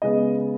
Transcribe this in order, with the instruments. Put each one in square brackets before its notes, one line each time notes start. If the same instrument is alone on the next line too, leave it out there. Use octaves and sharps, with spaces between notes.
[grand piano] C#3 G#3 B3 D#5